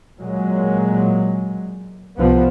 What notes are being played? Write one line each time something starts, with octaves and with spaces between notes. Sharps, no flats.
A#2 F#3 G#3
C2 F3 B3